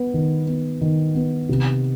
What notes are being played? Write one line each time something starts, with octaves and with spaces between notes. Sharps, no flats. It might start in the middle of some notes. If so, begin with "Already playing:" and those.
Already playing: B3
D#3
B3
D#3
B3
C3